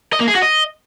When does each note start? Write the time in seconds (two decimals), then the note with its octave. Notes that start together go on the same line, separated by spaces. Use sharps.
0.13 D#5
0.20 A#3
0.28 G#4
0.35 F#4
0.42 D#5